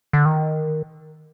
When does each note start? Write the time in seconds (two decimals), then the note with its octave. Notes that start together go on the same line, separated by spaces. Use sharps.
0.13 D3
0.25 D#3